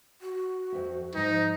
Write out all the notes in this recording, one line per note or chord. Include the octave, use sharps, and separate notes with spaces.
F#4
F2 E5
G#2 F3 D#4